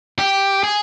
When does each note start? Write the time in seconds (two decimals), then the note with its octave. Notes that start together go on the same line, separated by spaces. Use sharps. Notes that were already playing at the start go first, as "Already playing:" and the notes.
0.19 G4
0.63 G#4